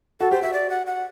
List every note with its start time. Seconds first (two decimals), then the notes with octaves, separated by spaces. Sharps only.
0.20 F#4 A4
0.31 G4 C5
0.42 F#4 E5
0.53 D5
0.70 F#5
0.87 F#5